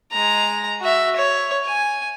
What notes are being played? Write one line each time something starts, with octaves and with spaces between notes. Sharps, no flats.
G#3 A#5
F#4 E5
C#5
G#5